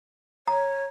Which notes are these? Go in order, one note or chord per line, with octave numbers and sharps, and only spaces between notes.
C#5 A#5